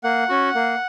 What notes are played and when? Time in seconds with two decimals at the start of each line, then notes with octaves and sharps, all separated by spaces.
0.04 A#3 F#5
0.29 C#4 F#4
0.55 A#3